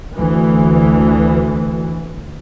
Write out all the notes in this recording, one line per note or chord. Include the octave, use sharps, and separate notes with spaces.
D2 E3